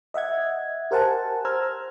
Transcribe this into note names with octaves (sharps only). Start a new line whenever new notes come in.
D#5 E5 F#5 G#6
G4 A#4 C5 F#5 G#5 A5
C5 A#5 E6 F6 G#6